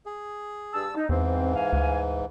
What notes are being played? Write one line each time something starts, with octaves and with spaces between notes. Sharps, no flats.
G#4
G2 A5 E6
D#4
E2 G#2 E3 C4
F5 G#5
D2